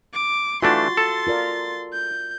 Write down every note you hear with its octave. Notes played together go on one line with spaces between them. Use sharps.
D6
E3 A3 D4 F4 F#4 C6 A6
A4
F4 A#4 D5
G6